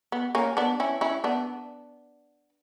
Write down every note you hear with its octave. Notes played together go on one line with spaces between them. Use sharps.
B3
A#3 C#4
B3 D4
C#4 E4
C#4 E4
B3 D4